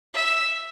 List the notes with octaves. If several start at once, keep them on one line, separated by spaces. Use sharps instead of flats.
E5